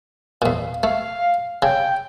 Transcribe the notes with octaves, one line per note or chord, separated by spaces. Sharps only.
E2 A#2 F5
A3 F5
C#3 G5